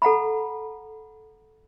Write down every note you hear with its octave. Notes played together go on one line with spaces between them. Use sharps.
A4 F#5 A#5 B5